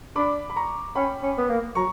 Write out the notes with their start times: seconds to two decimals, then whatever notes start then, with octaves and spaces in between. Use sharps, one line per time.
0.16 D4 B5 D6
0.50 B5
0.56 A#5 C#6
0.95 C#4 G5 B5
1.22 C#4
1.38 B3
1.50 A#3
1.75 F#3 A#5 C#6